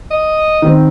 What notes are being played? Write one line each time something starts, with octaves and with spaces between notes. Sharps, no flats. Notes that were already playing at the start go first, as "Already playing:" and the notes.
D#5
D#3 C4